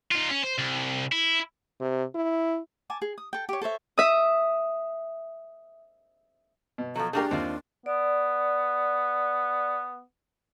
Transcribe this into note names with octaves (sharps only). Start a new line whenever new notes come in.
D#4 F4
C#4
C5
C2
E4
C3
E4
G#5 A5 D6
G#4
D#6
A4 G5
G4 C#5
A4 C5 C#5 E5
E5 D#6
B2
F3 F#3 A4
A3 A#3 D4 G4 G#4 A#4
D#2 C4 F4
B3 D5